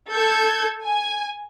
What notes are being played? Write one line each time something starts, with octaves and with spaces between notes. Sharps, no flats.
A4 G6 G#6
G#5